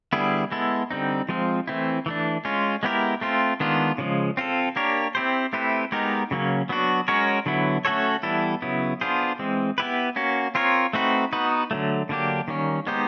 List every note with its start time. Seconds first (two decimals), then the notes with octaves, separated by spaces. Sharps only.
0.13 D3 G3 B3 E4 G#4
0.52 G#3 B3 E4 A4
0.91 D3 G3 C4 D#4
1.29 F3 G#3 C4 F4
1.67 E3 A3 C4 E4
2.06 E3 A3 D4
2.45 G#3 C#4 F4
2.83 G#3 B3 E4 G4 A#4
3.21 A3 C4 F4
3.60 D#3 G#3 B3 D4 F4
3.98 C#3 F3 G#3
4.37 C4 F4 A4
4.76 A#3 D4 G4 A#4 C#5
5.15 C4 E4 G4 C5
5.53 A3 C4 E4 G4 B4
5.92 G#3 B3 D#4 G4 A#4
6.31 C#3 F#3 A#3 C#4
6.69 F#3 B3 D4 F#4
7.08 G#3 C#4 F#4 A#4 C#5
7.46 D3 F#3 B3 E4
7.85 A3 C#4 F#4 A4 C#5
8.23 E3 G3 B3 E4 A4
8.62 C#3 F#3 B3 E4
9.01 B3 D4 F4 G#4 C5
9.39 E3 G#3 C4
9.78 B3 E4 G4 B4
10.16 A#3 C#4 F#4
10.55 C4 F4 A#4 C#5
10.93 A3 C4 D#4 F#4 B4
11.33 B3 D#4 F#4 B4
11.71 D3 F#3 A3
12.09 D3 F#3 A#3 D4 G4
12.48 D#3 G3 A#3 C#4
12.87 G#3 B3 D#4 G4 C5